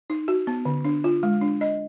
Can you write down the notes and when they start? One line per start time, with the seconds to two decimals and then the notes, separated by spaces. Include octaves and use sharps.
0.10 D#4
0.28 F#4
0.47 B3
0.65 D3
0.85 D4
1.04 F4
1.23 G#3
1.41 D4
1.61 D#5